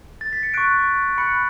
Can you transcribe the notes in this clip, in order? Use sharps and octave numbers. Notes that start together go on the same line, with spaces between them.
A6
B6
C#7
C#6 F#6 D7
B5 F#6 C#7